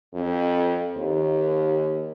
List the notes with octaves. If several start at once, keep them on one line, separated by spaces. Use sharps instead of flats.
F2
D#2